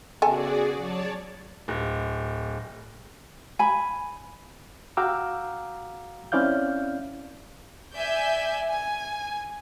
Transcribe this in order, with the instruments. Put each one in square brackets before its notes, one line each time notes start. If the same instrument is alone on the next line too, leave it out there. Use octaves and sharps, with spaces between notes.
[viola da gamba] C#3 B3 [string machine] F#4 G#4 D5 [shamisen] A4 G#5
[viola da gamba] F#3 [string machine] C#5 D5 A5
[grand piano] D1
[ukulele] G#5 B5
[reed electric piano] F#4 F5 G5 A#5 D6 E6
C4 C#4 E4 D5 F5 G6
[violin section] D5 E5 G#5 G6
G#5